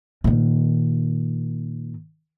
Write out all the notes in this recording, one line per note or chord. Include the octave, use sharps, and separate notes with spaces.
A#2 D#3